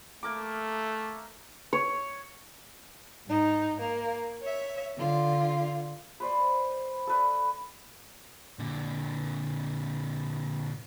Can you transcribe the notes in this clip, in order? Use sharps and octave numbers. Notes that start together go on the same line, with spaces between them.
A3 A#3 A#4 D6
C#5
G#2 D#4
A#3
C#5 E5
D3 F4
B4 C5 D5
A4 B4 D5
A#2 D3